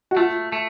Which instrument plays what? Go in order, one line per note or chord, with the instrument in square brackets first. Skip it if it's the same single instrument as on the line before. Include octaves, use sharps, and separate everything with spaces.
[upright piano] F#4
[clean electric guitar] A3 [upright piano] F4
[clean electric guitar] A3